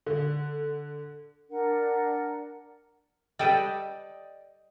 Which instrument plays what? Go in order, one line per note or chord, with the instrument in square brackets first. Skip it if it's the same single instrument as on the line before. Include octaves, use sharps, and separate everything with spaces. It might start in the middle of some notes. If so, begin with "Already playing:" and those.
[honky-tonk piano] D3
[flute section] D4 A#4 F#5
[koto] G3 A4 B4 [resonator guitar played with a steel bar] D5 D#5 G5